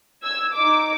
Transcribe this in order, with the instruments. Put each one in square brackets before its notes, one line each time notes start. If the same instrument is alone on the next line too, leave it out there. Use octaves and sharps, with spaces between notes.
[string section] E6 G#6
D#4 D6